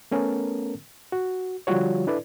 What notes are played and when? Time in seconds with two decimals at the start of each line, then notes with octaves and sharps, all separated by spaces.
0.11 A3 B3 C#4 A4 A#4
1.12 F#4
1.67 D3 F3 G3 F4 F#4 C#5
2.07 D4 E4 A4 B4 D5